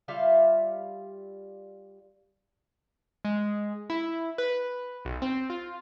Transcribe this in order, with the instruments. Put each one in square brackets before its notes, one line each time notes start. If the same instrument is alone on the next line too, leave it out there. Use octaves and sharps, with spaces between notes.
[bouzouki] G3 F4 E5 F5
[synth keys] G#3
E4
B4
B1
C4
F4